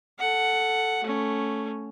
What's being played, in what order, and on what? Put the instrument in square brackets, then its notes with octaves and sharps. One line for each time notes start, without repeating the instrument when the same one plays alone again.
[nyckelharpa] A4 F#5
A3 C#4